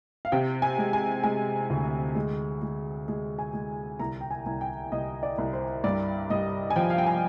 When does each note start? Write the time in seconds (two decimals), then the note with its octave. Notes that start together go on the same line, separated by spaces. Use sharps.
0.25 F5
0.32 C3 G5
0.62 G#5
0.78 G#3
0.93 G#5
1.23 G#3 G#5
1.70 D2
2.15 G#3
2.62 G#3
3.08 G#3
3.39 G#5
3.54 G#3
4.00 C2 A#5
4.21 G5
4.31 G#5
4.46 C2
4.61 G5
4.92 C2 D#5
5.23 D5
5.38 C2
5.53 C5
5.84 G2 D5
6.30 G2 D#5
6.70 G#5
6.76 F3 G5
6.90 F5
6.98 G5
7.06 G#5